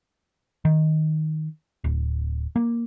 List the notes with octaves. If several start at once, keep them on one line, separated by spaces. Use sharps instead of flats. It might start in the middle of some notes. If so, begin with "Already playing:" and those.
D#3
D1
A#3